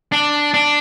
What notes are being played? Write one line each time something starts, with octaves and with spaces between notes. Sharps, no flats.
D4
D4